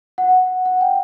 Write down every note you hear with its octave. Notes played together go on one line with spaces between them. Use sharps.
F#5
F#5
G5